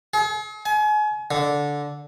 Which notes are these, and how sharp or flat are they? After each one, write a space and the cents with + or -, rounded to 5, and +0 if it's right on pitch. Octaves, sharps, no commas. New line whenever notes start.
G#4 +45
G#5 +35
D3 -10